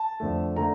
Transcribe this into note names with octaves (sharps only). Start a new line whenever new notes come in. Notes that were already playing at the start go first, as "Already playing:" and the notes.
Already playing: A5
F2 D3 A3
D3 A3 A#5